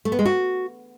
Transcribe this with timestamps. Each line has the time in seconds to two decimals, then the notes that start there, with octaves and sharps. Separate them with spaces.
0.05 A3
0.12 B3
0.19 G#3
0.25 F#4